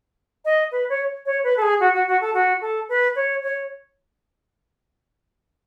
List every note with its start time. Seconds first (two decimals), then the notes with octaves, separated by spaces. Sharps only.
0.45 D#5
0.71 B4
0.89 C#5
1.26 C#5
1.43 B4
1.57 A4
1.62 G#4
1.80 F#4
1.93 F#4
2.07 F#4
2.21 A4
2.34 F#4
2.61 A4
2.89 B4
3.15 C#5
3.42 C#5